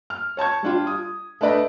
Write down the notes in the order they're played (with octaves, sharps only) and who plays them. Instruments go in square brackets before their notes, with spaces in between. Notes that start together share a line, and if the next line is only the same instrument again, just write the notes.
[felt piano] F6
C#5 A5 C#6 G#6
G3 D4 F4
D#6
A3 D4 B4 D5 D#5